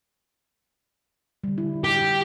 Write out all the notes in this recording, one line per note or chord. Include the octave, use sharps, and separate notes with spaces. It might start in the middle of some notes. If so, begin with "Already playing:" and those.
D3 G3
E4
G4